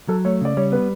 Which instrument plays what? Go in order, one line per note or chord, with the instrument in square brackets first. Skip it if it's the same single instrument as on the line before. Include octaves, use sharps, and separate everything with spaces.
[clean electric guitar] F#3 [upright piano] A4
[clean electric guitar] A3 [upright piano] C#5
[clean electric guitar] C#3 [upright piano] D5
[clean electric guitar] G3 [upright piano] C#5
[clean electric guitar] B3 [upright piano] B4